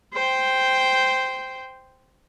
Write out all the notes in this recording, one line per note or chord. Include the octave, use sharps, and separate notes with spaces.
C5 G5